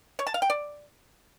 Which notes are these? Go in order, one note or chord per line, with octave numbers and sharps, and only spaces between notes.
C#5
A5
F5
G5
D5